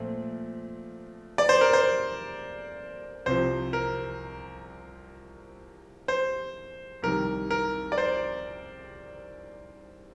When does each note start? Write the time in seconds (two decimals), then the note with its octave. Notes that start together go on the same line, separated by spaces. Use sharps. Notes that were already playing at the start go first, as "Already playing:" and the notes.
Already playing: A#2 F3 A3 C4
1.38 D5
1.49 C5
1.61 A#4
1.73 C5
3.26 C2 C3 F3 C5
3.73 A#4
6.08 C5
7.02 C2 C3 D#3 G3 A#4
7.50 A#4
7.92 D5
7.98 C5